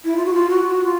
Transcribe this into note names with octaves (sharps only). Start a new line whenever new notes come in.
E4
F4
F#4
F4
F#4
F#4
F4